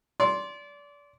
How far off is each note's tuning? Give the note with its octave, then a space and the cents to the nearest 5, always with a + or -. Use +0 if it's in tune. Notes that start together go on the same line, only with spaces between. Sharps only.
D5 -30 C6 +0